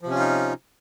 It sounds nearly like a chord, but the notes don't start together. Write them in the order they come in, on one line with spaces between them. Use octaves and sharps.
F3 C3 C#4 F4 D#4